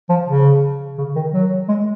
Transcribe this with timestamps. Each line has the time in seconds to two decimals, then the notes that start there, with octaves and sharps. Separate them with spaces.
0.09 F3
0.28 C#3
0.98 C#3
1.16 D#3
1.33 F#3
1.68 G#3